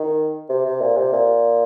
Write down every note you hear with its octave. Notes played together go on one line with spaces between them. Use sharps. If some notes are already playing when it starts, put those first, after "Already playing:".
Already playing: D#3
C3
C3
A#2
C3
A#2